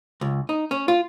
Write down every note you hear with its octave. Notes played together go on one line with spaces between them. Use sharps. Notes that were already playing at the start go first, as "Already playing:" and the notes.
C#2
D#4
C#4
F4